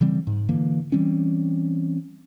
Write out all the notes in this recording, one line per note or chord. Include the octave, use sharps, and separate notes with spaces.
C#3 E3 G3 C4
G#2
D3 E3 A#3
E3 G3 C4 C#4